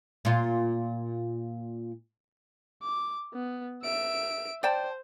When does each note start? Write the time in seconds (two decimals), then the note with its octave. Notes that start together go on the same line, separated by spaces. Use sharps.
0.25 A#2 F4
2.83 D6
3.33 B3
3.83 E5 D7
4.63 C5 D5 G5 A5